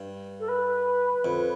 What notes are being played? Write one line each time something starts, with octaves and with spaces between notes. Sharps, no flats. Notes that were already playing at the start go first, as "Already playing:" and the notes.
Already playing: G2
A4
B4
F2